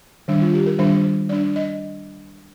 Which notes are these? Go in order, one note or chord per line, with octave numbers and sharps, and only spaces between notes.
D#3 G3 D4
F4
G4
A#4
D#3 G3 D4 C5
G3 D4 D5
D#5